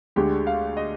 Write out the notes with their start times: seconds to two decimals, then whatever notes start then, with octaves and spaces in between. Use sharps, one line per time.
0.16 D2 D3 G#3 G4
0.47 F5
0.77 D#5